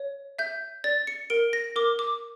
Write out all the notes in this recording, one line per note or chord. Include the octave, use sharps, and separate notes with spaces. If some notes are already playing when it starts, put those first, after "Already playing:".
Already playing: C#5
E5 G6
D5 A6
C#7
A#4 D7
A#6
A#4 D6
D6